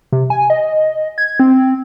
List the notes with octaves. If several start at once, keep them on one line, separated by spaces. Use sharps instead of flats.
C3
G#5
D#5
G#6
C4